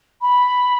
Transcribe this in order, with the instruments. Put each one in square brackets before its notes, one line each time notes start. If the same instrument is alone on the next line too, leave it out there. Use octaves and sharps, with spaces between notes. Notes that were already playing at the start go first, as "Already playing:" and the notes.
[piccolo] B5